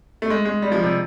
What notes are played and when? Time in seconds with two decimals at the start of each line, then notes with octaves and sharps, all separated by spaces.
0.22 A3
0.30 G#3
0.45 G#3
0.62 G3
0.72 F3
0.83 C3